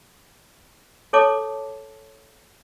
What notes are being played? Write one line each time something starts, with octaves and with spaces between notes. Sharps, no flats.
A4 C#5 A5 D6